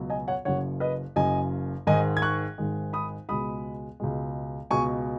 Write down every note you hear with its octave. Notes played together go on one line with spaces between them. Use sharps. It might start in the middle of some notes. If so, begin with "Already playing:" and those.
Already playing: C#2 B2 F#3
D#5 G#5
C#5 F#5
F#1 F#2 C#3 C#5 F#5
B4 D#5
F#1 F#2 C#3 D#5 G#5
G#1 G#2 D#3 G#3 D#5 G#5
G#6
C#6 F#6
G#1 G#2 D#3 G#3
B5 D#6
C#2 B2 G#3 B5 D#6
C#2 B2 G#3
C#2 B2 G#3 G#5 C#6